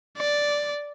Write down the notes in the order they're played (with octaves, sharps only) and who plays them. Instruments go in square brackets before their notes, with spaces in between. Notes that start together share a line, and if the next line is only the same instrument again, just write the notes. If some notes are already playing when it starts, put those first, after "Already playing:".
[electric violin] D5